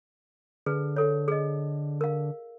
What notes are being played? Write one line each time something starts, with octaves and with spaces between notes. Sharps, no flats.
D3 G#4 B4
A4 C#5
G#4 D#5
A#4 F5